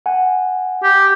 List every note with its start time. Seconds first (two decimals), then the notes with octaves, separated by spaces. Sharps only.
0.06 F#5 G#5
0.83 G4